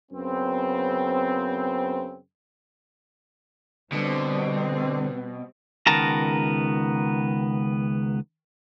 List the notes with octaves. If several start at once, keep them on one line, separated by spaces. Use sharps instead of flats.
F#2 C#3 B3 C4
B2 D3 G3 C4
C#2 D#3 B3 A#4 A5 A#5